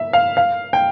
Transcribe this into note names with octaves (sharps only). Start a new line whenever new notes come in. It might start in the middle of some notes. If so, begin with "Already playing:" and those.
Already playing: E5
F5
F5
G5